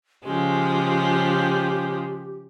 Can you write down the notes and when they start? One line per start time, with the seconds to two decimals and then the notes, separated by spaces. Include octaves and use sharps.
0.25 C#3 F3 G#3 G4